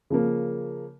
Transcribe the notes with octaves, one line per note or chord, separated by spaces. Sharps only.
C#3 F3 A#3